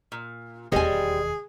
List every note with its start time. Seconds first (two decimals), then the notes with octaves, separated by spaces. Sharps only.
0.12 A#2
0.72 E1 D#2 G3 C4 G#4 D#5 G#5